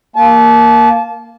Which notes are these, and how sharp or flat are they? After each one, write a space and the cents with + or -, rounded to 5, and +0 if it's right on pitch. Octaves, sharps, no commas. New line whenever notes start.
A#3 +0 A5 -30